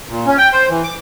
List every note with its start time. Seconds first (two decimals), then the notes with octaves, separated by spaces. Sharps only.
0.09 A#2
0.26 C#4
0.38 G5
0.52 C5
0.69 E3
0.84 D6